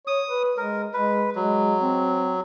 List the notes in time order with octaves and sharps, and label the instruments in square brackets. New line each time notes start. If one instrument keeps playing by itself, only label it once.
[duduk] C#5 [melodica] D#6
[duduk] B4
[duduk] G#3 [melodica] A#4
[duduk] G#3 [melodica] B4
[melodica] F#3 [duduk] G#3
[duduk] C4